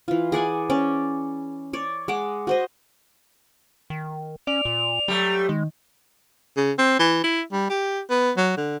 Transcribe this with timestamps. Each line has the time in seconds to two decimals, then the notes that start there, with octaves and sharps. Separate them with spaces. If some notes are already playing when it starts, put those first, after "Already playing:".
0.08 E3 F4
0.32 G#4 D5 F#5 G#5
0.70 C#4 D5
1.73 C#5 D5
2.08 G#3 F#5 D6
2.47 F#4 C5 D#5
3.90 D#3
4.47 C#4 D5 F7
4.65 A#2
5.08 F#3 G3 A3
5.49 D#3 G#3
6.57 C#3
6.79 C4
6.99 E3
7.24 E4
7.52 G3
7.70 G4
8.10 B3
8.37 F#3
8.57 D3